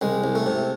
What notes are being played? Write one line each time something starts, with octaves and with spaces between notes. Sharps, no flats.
C2 G#3
C2
A3
C3